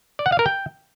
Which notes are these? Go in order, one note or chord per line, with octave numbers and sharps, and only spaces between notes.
D5
F#5
F5
A#4
G5